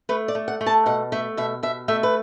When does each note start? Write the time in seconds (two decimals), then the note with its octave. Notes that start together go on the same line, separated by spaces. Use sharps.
0.09 A3 B4
0.28 D5
0.35 A3
0.48 F#5
0.61 A3
0.66 A5
0.86 B2 F#5
1.12 A3 E5
1.37 B2 E5
1.63 B2 E5
1.88 A3 E5
2.03 B4